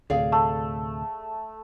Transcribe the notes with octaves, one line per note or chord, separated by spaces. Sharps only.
D2 A2 C3 G#4 D5 F5
A3